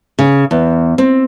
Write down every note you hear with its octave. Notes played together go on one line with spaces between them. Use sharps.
C#3
E2
C4